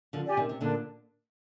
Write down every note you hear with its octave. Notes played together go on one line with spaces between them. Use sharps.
D3 F3
G4 D5 G#5
C3 D#3
C3
A#2 D3 D4